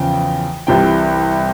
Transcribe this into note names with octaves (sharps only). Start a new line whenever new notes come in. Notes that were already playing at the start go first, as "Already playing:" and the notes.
Already playing: E2 C#3 F3 G5
C2 C3 E3 G5